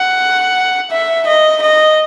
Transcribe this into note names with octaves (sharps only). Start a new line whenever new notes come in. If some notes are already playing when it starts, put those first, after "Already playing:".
Already playing: F#5
E5
D#5
D#5